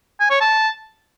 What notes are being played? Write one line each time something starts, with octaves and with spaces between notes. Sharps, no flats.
G#5
C#5
A5